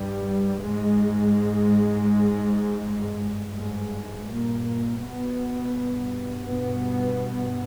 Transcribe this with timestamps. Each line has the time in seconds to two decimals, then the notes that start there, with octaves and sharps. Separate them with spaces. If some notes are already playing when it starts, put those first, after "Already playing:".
Already playing: G2 G3
0.63 G#2 G#3
2.82 G2
3.54 G#2 G#3
4.27 A#2 A#3
5.01 B2 B3
5.72 G2
6.46 B2 B3